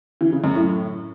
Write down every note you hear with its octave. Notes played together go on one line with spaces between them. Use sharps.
E3
C#3
F#2
A2